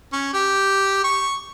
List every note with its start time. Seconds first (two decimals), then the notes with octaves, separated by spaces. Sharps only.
0.13 C#4
0.34 G4
1.04 C#6